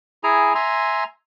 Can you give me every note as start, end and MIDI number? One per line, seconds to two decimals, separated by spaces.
0.24 0.53 64
0.24 0.53 68
0.24 0.53 80
0.24 0.53 82
0.55 1.04 76
0.55 1.04 80
0.55 1.04 82
0.55 1.04 84